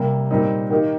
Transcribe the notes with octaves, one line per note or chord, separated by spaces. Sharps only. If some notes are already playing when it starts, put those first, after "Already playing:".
Already playing: C3 G3 A#3
A#2 G3 C4 D#4
D#3 A#3 D#4 G4